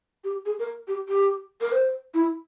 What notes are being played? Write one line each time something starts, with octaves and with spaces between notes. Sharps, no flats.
G4
G#4
A#4
G4
G4
A#4
C5
E4